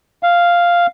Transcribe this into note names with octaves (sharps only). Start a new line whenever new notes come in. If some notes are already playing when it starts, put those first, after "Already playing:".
F5